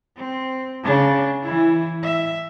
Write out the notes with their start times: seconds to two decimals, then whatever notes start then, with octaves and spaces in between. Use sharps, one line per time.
0.17 C4
0.84 C#3 D4
1.43 E3 E4
2.03 E5